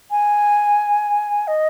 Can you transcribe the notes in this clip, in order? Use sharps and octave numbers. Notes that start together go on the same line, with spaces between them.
G#5
D#5